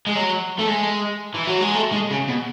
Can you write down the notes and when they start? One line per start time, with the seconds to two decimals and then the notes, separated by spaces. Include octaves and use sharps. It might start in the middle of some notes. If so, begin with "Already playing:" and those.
0.07 G#3
0.15 F#3
0.59 A3
0.68 G#3
1.34 E3
1.47 F#3
1.61 G#3
1.75 A3
1.92 G#3
2.10 C#3
2.28 B2